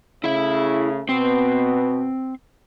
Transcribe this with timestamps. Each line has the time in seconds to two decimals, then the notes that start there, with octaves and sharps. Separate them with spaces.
0.24 C#3 A3 E4 E5
1.09 B2 B3 C4